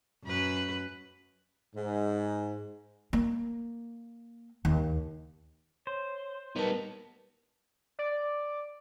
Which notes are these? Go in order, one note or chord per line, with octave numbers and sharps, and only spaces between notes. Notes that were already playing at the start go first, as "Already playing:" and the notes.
F#2 B4
G#2
A#3
D#2
C5 C#5
G3 B3 D#4 A#4 B4 A5
D5